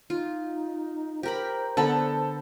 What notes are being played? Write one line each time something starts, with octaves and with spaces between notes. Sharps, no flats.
D#4 F4
G4 A#4 C5 B5
D3 B3 A4 B5